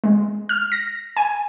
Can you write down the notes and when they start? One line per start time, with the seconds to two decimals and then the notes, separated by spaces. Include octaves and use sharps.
0.04 G#3
0.49 F6
0.72 A#6
1.17 G#5